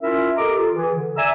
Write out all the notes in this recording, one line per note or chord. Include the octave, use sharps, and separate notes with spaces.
C#4 E4 F4 A#4 E5
G4 A4 A#4 D#5 A#5 D6
F4 A4
E3 G#4
D3
D5 E5 G#5 A#5 E6